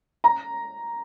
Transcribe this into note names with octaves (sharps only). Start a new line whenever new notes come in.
A#5